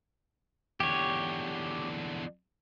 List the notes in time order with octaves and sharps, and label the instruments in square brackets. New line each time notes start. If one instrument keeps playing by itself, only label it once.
[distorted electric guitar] E2 D3 [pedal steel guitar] G4 C#5